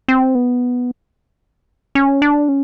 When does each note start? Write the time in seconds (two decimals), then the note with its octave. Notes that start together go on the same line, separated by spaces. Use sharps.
0.08 C4
0.35 B3
1.95 C#4
2.22 D4
2.49 C#4